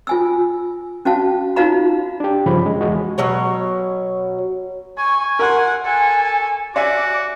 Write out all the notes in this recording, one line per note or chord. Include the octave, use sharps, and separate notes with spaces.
F4 G#5 E6
C#4 F#4 F5 A5
D#4 F4 F#4 F5 A#5 B5
D4 G4
G2 C#3 F3 B5
G#3
E2 G#3 F#4
B2 F#3 C#5
G#5 C#6
A#4 F#5 C6
A4 G#5
F#4 D5 E5 G#5 D6